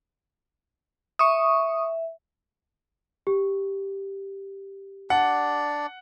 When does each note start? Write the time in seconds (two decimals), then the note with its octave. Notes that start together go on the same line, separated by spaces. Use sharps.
1.19 E5 C#6 D#6
3.27 G4
5.10 D4 D5 F#5